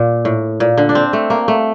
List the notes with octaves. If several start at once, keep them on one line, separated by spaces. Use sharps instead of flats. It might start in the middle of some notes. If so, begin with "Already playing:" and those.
Already playing: A#2
A2
A#2
D3
D4
C4
A3
A#3
A3